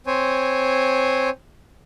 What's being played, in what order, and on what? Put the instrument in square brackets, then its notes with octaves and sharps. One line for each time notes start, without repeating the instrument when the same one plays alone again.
[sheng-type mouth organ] C4 C5 C#5 G#5